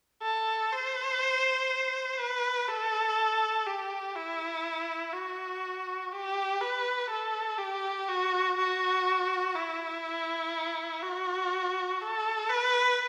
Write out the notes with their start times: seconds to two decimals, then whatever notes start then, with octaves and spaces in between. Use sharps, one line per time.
0.22 A4
0.72 C5
2.19 B4
2.68 A4
3.66 G4
4.16 E4
5.13 F#4
6.12 G4
6.61 B4
7.10 A4
7.58 G4
8.08 F#4
8.57 F#4
9.55 E4
11.02 F#4
12.01 A4
12.50 B4